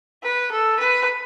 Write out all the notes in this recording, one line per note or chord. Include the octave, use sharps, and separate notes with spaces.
B4
A4
B4